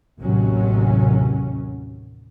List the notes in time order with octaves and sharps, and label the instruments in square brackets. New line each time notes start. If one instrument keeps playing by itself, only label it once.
[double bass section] A1 D#2 C3 F#3 C#4